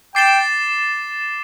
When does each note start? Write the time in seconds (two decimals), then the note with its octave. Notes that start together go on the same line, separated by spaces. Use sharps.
0.15 G5 D6 A6 C7 E7 G7